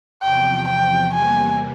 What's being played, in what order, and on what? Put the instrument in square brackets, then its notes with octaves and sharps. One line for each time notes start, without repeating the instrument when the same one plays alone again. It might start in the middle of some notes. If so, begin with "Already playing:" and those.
[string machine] E2 C3 F3 [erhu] G5
[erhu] G5
[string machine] E2 C3 E3 G3 A#3 [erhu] G#5